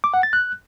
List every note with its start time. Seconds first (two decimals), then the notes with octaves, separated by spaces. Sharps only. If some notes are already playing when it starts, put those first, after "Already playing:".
0.04 D6
0.14 F#5
0.23 A6
0.33 F#6